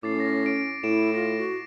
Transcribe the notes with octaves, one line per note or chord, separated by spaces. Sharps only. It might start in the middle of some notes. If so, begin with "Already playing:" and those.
A2 C#4 D6 A6 C7
A#6
D7
A2 E4 D7 E7
F4 A#6
F#4